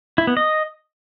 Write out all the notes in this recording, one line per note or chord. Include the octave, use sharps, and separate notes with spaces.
E4
B3
D#5